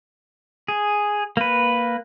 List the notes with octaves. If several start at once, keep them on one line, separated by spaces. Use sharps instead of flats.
G#4
A#3 B4